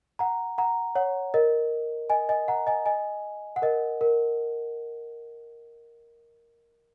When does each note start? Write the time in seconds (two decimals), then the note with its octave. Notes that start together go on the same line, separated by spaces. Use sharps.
0.19 F#5 A#5
0.58 F#5 A#5
0.95 C#5 F#5
1.34 A#4 D#5
2.10 D#5 G#5
2.29 D#5 G#5
2.48 F#5 A#5
2.67 D#5 G#5
2.86 D#5 G#5
3.56 F#5
3.62 A#4 D#5
4.01 A#4